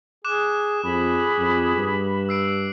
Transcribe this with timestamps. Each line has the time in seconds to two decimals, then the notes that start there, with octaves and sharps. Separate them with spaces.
0.25 G#4 D6 F#6 E7
0.84 F2 G#4 B5
1.38 F2
1.77 G2
2.29 E6 C7 D7